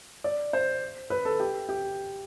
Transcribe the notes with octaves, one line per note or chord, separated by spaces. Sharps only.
D5
C5
B4
A4
G4
G4